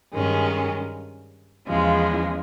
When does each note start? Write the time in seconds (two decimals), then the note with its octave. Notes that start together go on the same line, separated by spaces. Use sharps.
0.14 G2 D#3 G#3 C#4
1.68 E2 C#3 F3 G#3